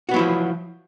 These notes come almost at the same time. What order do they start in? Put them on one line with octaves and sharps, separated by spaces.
F#4 B3 F#3 E4 F3